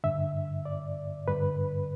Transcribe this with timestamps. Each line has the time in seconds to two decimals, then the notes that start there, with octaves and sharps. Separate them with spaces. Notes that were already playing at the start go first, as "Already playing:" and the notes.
0.04 G2 D3 E5
0.65 D5
1.28 G2 D3 B4